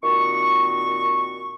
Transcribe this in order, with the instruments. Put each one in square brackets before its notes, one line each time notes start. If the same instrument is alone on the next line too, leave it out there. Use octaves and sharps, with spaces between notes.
[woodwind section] A#2 D#3 C4 F#4 C#6